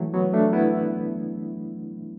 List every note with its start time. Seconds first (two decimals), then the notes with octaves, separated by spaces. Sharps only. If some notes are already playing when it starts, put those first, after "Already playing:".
Already playing: E3 F#3 A3
0.14 F#3 B3
0.33 A3 D4
0.53 B3 E4